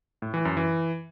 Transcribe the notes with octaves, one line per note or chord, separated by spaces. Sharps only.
A2
E3
F#2
E3